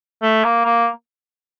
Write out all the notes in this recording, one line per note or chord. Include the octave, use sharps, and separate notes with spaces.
A3
A#3
A#3